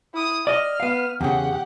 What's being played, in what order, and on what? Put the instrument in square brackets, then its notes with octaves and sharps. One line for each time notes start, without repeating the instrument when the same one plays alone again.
[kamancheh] E4 D#6
[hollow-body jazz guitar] D5 D#5 [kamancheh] F6
[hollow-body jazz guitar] B3 F5
[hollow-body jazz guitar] E2 C#3 [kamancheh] G4 F#5